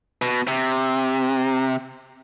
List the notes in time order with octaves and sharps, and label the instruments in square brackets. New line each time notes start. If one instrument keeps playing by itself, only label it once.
[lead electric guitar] B2
C3